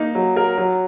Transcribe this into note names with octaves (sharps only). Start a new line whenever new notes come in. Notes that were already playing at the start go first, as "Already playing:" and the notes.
Already playing: A#3 D#4
F#3
A#4
F#3